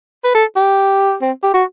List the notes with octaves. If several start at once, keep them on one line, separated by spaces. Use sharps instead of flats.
B4
A4
G4
C4
G4
F#4